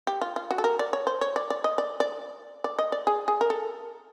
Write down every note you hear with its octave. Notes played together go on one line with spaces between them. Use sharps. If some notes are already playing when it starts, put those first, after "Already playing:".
G4
F4
F4
F#4
A4
A#4
D5
C#5
C5
C#5
D5
D5
D#5
D5
D5
D5
D#5
D5
G#4
G#4
A#4
A4